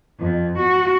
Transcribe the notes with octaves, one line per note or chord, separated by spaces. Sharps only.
F2
F#4